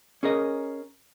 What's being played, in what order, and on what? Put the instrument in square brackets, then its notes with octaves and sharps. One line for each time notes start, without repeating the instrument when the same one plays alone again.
[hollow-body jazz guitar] C#4 G#4 A#4 D#5